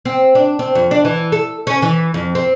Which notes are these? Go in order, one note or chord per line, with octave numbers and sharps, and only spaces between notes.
C4
D4
C4
F2
D4
E3
A4
C#4
E3
F2
C4